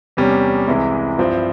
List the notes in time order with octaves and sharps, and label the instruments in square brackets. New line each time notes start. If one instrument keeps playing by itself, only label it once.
[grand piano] E2 C3 G3 C#4
C2 C3 E3 G#3 E4
G2 F3 C4 E4